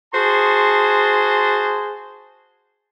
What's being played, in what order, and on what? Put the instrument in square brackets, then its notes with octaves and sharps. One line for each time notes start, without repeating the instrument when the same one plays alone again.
[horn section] F#4 G#4 C5 A5 C6